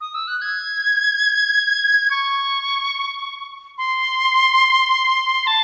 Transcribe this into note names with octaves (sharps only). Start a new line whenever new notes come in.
D#6
E6
F#6
G#6
C#6
C6
A5